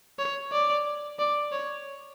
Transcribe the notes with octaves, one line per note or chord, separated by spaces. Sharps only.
C#5
D5
D5
C#5